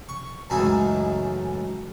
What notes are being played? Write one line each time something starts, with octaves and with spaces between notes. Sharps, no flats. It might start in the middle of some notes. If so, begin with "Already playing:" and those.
C#6
C#2 F#2 A2 E3 D#4 E4